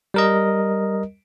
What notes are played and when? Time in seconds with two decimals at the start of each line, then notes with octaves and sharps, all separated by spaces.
0.14 G3 A#4 D#5